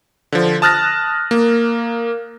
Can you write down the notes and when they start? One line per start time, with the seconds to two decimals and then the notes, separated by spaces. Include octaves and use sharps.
0.32 D3 F3
0.62 A5 D#6 F6 F#6 A6 A#6
1.31 A#3